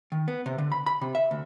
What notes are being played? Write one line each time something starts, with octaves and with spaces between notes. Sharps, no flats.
D#3
B3
C3
D3
B5
B5
C3
E5
D2